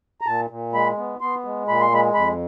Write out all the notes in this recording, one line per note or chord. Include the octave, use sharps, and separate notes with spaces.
A#5
A#2 A5
A#2
G#3 B5
B3
B3 C6
G#3
A#2 B5
C6
G#3 B5
F2 B5